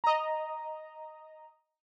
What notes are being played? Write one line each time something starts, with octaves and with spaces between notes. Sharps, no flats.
D#5 A#5